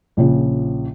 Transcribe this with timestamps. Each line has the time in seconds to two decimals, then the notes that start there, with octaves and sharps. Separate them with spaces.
0.17 A#1 C#3 F3